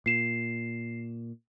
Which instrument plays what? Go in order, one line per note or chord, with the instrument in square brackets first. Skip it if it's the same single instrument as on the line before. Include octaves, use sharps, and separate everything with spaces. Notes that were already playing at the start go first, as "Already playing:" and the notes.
[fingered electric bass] A#2 [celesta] C7 E7